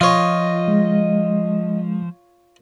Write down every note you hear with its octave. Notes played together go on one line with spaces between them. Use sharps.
F3 F4 C#5 D#5
G#3